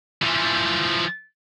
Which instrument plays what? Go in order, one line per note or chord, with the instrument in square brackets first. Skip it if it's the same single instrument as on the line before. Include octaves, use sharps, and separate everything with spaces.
[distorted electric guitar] E3 F3